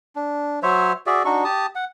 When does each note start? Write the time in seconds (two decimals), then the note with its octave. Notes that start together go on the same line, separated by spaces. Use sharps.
0.16 D4
0.63 F#3 C5 C#5 E5
1.06 F#4 G#4 D5 E5
1.25 D4 D#4 F#4 C#6
1.45 G4 A5 D#6
1.75 F#5